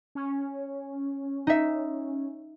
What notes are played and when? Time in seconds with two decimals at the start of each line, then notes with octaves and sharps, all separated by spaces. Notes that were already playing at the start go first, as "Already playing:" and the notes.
0.15 C#4
1.47 D#4 E5